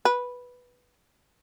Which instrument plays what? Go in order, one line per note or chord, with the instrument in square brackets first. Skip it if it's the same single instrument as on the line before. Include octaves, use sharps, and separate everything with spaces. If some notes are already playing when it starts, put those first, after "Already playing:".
[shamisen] B4